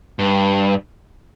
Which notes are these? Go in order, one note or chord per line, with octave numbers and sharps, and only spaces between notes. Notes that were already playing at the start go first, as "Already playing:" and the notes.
G2